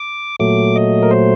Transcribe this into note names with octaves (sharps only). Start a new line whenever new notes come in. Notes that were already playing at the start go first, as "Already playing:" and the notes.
Already playing: D6
A#2 F#3 A3 D6
D#5
A#4
C5